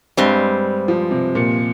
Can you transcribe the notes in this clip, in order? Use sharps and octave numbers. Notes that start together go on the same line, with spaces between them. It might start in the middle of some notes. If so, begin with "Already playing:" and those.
G2 G3 G#3 C4
F3
C3
A#2